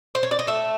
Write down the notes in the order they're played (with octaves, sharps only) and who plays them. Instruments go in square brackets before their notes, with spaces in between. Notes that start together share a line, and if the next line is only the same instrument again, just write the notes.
[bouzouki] C5
C#5
D5
D#5
A3 E5